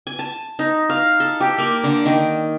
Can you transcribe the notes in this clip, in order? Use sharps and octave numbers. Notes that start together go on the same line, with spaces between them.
G#5
A5
D#4
F5
A4
G4
A#3
D3
D#3